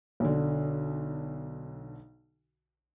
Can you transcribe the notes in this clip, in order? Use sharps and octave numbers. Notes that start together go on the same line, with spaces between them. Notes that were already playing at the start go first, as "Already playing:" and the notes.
B1 D3